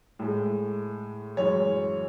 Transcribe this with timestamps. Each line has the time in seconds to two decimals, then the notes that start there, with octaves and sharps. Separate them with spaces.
0.19 A2 G#3
1.37 F#2 E3 G#3 C#5